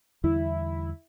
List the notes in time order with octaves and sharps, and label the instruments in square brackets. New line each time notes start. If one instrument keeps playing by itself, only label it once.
[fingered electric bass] E2 D3 G3 [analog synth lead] E4